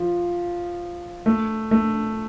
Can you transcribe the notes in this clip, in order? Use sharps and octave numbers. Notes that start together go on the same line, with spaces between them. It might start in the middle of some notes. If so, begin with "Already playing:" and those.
Already playing: F3
A3
A3